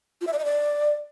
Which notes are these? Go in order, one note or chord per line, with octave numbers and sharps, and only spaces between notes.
F4
E5
D5
D#5
D5